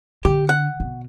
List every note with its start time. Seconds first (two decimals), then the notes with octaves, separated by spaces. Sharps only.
0.25 D3 G4
0.49 F#5
0.80 B2